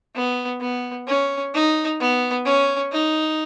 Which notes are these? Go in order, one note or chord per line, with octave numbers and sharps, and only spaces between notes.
B3
B3
C#4
D#4
B3
C#4
D#4